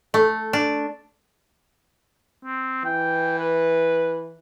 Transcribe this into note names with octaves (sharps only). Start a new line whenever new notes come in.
A3
D4
C4
E3 G5
B4